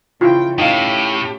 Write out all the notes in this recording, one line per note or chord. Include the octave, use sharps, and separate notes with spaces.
C#3 E4 F4 G5
A2 A3 C#4 D#4 G4 F5